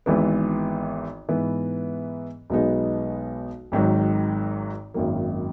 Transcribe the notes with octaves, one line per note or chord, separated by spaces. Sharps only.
G#1 G#2 E3 B3
G#2 E3 B3
B1 B2 G#3 B3 D#4
G#1 G#2 D#3 F#3
G#1 F#2 D#3 F#3 A#3